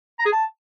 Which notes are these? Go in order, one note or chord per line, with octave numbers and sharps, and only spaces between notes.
A#5
G#4
A5